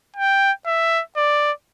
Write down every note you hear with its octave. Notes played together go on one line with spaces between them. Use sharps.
G5
E5
D5